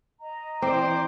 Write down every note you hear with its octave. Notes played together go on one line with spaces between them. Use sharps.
D#5 A#5
E3 C4 C5 D5 D6